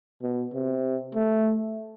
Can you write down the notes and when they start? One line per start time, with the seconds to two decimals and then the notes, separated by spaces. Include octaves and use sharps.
0.22 B2
0.54 C3
1.15 A3